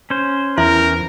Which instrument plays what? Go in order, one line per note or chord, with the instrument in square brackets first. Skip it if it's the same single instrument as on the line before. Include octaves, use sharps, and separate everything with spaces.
[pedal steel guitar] C#4 C5
[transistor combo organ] E2 [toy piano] E4 E5 [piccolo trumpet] A#4